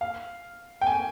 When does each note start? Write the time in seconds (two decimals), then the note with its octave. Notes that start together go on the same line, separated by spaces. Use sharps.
0.01 F5
0.81 G5
0.87 G#5